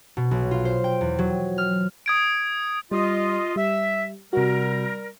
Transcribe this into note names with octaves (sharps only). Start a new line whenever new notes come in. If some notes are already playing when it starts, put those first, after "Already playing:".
B2
B1
F4
C5
G5
E2
F#3
F6
D#6 G#6 D7
G3 F4 D#5
G3 E5
C3 G3 F#4 A#4